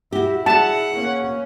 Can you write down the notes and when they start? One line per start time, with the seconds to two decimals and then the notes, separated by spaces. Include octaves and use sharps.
0.12 E4 F#4 G4
0.46 F#4 G#4 F#5 A5
0.93 A#3 C#4